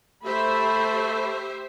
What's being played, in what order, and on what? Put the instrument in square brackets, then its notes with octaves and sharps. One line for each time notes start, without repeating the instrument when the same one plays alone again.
[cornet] A3 [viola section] G4 C5 E5 [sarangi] B5